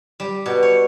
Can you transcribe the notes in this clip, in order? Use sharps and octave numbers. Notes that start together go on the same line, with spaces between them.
G3
B2
C#5